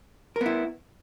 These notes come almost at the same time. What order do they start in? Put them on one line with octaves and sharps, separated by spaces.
A#4 B3 E4